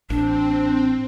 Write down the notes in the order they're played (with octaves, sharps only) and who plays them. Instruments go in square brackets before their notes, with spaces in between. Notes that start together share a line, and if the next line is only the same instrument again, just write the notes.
[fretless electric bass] A1 [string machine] C4 [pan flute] D4